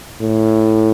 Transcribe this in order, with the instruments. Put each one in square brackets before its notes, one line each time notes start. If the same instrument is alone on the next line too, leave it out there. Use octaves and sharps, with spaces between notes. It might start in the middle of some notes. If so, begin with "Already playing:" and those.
[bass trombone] A2